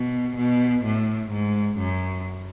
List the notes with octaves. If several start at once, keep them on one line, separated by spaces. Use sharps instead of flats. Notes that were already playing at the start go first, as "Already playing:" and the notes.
Already playing: B2
B2
A2
G#2
F#2